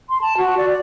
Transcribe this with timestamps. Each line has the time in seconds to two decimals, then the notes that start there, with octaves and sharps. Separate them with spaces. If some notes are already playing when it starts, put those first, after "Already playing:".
0.09 C6
0.21 A5
0.37 F#4
0.57 D5
0.69 D5